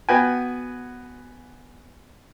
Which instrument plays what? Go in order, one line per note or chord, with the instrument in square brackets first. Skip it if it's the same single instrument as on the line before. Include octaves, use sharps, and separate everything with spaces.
[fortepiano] B3 F#4 B4 G5 G#5